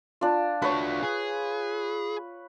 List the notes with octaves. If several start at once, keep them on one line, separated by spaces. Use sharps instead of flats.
D4 F4
D4 F#4 B4 C#5
G#4